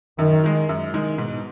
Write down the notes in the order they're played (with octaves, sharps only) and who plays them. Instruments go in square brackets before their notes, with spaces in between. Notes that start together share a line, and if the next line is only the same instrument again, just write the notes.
[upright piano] F#2 [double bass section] D#3
[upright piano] D#3 G#3
F#2
D#3 G#3
[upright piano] G#2 [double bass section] B2